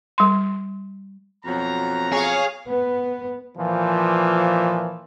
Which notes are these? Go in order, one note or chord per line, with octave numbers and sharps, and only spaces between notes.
G3 C6
F2 B2 F#3 A#5
G#4 C#5 F5
B3
A#2 E3 F3